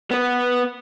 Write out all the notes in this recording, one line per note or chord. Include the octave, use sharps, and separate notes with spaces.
B3 B4